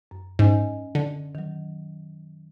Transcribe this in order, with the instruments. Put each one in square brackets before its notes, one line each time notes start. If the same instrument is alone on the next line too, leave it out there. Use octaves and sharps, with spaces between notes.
[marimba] F#2
[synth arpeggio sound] G#2 [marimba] C#4 D#5 G#5
[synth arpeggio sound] D3
[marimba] D#3 F#3